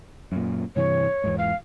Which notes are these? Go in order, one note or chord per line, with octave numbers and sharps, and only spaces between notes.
F#2 A#2
G2 C3 E3 C#5
E2 G#2
F5